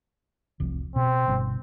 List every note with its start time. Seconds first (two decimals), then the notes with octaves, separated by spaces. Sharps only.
0.60 F1 C2 F2
0.96 B2 C4
1.28 G1 B2